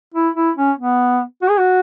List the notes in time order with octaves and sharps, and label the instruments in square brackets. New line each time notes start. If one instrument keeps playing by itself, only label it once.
[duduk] E4
E4
C#4
B3
F#4
G#4
F#4